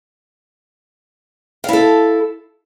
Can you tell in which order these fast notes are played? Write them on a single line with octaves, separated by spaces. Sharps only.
F5 E4 A4